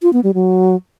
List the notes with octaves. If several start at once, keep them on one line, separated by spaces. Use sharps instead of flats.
F4
B3
G3
F#3